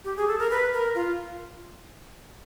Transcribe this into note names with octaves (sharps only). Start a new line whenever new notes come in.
G4
G#4
A4
A#4
B4
A#4
F4